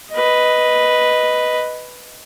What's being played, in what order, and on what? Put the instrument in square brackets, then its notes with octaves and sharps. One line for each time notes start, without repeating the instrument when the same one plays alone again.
[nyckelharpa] B4 D#5